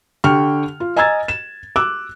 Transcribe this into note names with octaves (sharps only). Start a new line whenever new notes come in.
D3 G4 G5 C#6 F6
F4
D#5 G#5 A#5 E6 G#6 A6
E7
D6 E6 F#6